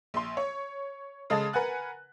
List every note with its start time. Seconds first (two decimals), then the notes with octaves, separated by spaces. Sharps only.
0.14 A#1 C6
0.37 C#5
1.30 C#3 G#3 A4 D#5 A5 A6
1.53 A#4 B4 F#5 G#5 F#6